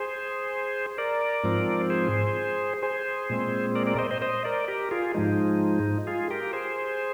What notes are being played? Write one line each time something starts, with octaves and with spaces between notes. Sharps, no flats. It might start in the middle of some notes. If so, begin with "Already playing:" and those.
Already playing: G#4 C5
A#4 D5
G#2 F3 C4
G#4 C5
G#4 C5
A#2 G#3 C4
A#4 D5
A#4 D5
C5 D#5
C5 D#5
C5 D#5
A#4 D5
G4 A#4
F4 G#4
G#2 F3 G#3 D#4
F4 G#4
G4 A#4
G#4 C5